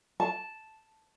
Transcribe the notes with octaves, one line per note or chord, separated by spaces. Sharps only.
A5